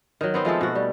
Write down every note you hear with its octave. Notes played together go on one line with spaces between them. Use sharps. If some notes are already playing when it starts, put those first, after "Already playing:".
D#3 F#3
B3 C4 D#4
F3 G#3 A3 A4
B2 F#4
G3